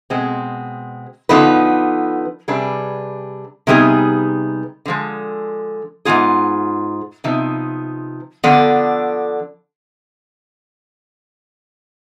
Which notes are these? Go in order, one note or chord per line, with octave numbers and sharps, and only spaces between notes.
B2 G#3 C4
D3 F3 B3 D#4 B4
C3 G3 D4 G#4 B4
C3 G3 B3 D#4 G#4
D3 F3 G#3
G#2 F3 B3 F4 G#4
C3 F3 B3 D#4
D3 F3 B3 D4